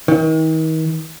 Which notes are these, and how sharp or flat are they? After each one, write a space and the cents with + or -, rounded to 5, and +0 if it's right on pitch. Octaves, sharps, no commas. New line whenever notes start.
D#3 +40